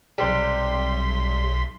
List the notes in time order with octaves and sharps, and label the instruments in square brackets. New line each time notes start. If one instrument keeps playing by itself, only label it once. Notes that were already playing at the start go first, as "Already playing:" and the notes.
[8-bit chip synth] B1 C6 B6 [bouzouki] C3 G3